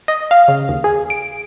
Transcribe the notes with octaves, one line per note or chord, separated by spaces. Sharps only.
D#5
F5
C#3
D#2
G#4
D7